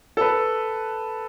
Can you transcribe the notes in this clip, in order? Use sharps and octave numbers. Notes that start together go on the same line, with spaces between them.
A4 B4